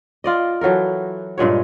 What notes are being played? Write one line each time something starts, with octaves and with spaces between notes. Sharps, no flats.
F4 D5 D#5
E3 F#3 A4 A#4
G2 A#2 G#3 C#5